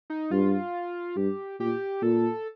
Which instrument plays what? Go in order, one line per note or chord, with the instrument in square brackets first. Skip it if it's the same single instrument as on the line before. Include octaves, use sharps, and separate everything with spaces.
[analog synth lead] D#4
[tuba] G2 [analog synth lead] F4
[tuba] G2 [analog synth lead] G4
[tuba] A#2 [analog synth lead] G4
[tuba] A#2 [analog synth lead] A4